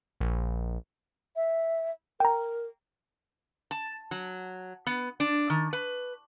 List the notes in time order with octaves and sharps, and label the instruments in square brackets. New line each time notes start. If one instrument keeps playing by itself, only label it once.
[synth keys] A#1
[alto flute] E5
[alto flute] A#4 [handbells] G5 A#5
[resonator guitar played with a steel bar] A5
F#3
B3
D4
D#3
B4